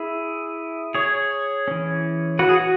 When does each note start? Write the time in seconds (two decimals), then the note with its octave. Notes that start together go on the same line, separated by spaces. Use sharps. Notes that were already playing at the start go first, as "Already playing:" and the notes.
Already playing: E4 G#4
0.94 G#4 C#5
1.68 E3 C#4
2.39 F#4 B4
2.49 G#4
2.57 F#4